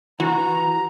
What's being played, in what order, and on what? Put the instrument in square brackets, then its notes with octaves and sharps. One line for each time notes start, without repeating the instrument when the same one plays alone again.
[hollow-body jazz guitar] E3 [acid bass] F#4 [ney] A#5